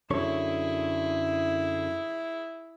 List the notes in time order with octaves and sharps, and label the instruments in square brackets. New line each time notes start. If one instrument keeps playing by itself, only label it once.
[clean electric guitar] F#2 D3 C#5 [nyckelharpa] E4 G#4